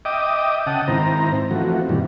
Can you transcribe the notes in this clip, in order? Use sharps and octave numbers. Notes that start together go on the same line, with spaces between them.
D#5 E5 G5 D6 D#6
C#3 F#5 G5 A5 D#6
G#2 D#3 C4 E4 C5 A#5
E3 F3 A3 C4 F#4
G2 A#2 D#3 E3 G3